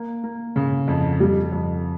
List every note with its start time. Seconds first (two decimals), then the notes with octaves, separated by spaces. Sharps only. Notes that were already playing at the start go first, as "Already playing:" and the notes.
Already playing: A#3
0.24 A#3
0.56 C#3
0.88 F2
1.20 F2 G3
1.52 F2